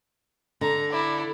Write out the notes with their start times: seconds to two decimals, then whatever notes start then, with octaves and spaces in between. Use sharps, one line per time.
0.61 D3 A#5
0.92 E4 D5